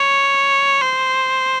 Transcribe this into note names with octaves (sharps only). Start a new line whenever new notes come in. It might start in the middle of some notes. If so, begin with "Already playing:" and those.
Already playing: C#5
C5